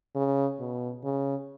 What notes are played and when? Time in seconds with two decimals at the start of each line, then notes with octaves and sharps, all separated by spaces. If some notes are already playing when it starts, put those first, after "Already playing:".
0.15 C#3
0.59 B2
1.03 C#3